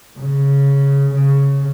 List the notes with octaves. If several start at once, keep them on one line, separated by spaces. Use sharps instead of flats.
C#3
C#3